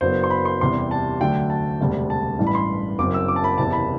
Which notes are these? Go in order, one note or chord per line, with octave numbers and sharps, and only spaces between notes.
F#1 F#2 F#3 B3 D4 C5
C6
B5
C6
E2 C3 G3 C6
A5
D2 D3 F#3 A3 G5
A5
E1 D2 C3 G3
A5
A1 G2 E3
B5
C6
F#1 F#2 F#3 C4 D6
E6
D6
A5
B5
F#1 E2 C3 A5
B5